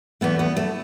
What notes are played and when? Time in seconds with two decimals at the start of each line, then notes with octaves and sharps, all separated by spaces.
0.21 E2 E3 A3 B3
0.39 B3
0.57 A3